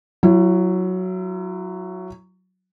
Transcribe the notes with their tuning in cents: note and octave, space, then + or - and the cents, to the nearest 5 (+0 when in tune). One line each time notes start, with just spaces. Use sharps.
F#3 +0 E4 +35